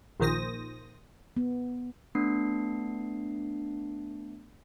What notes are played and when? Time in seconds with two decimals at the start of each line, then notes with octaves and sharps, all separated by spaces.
0.20 A#1 A#2 D#3 C5 D#6 A#6
1.37 B3
2.15 A3 B3 D4 C7